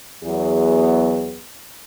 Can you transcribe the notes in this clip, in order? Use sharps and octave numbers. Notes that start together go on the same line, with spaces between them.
E2 F#3 B3 G#4